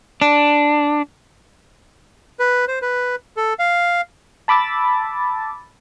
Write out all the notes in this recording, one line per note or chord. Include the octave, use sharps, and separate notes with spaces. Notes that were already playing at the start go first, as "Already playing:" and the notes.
D4
B4
C5
B4
A4
F5
A5 B5 D6 E6 A6